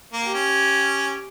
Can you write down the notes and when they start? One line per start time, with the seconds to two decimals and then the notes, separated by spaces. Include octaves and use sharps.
0.13 A#3
0.24 G4
0.34 C#4